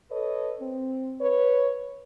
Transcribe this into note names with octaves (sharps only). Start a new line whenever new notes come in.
A4 B4 C#5 D#5
C4
B4 C#5